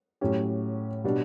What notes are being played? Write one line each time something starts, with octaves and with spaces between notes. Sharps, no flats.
A2 F#3 C#4 G4
B2 G3 D4